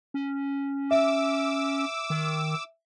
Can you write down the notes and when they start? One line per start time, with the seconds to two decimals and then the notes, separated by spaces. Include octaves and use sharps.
0.14 C#4
0.91 E5 D6 E6
2.10 D#3